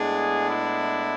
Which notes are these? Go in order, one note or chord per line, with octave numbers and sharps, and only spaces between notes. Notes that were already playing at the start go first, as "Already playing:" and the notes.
Already playing: A2 G#3 B3 D4 G#4
E4